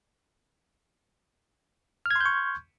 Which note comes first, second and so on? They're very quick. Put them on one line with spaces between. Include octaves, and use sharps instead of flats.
F6 G#6 C6 G6 C#6